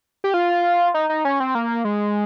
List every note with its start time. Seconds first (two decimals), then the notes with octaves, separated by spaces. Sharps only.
0.24 G4
0.34 F4
0.94 D#4
1.09 D#4
1.25 C#4
1.40 C4
1.55 A#3
1.85 G#3